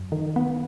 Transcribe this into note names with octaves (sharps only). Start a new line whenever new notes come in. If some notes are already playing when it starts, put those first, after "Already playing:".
Already playing: F#2
D#3
B3